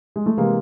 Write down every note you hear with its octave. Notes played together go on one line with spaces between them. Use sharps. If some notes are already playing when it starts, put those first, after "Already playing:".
G#3
A3
C3 E3 G#3 A#3